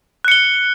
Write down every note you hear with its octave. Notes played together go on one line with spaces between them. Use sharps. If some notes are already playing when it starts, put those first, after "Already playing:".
F#6 C#7 G7